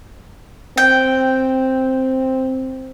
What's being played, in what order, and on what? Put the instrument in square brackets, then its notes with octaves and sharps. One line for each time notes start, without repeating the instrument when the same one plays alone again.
[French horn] C4 [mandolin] G5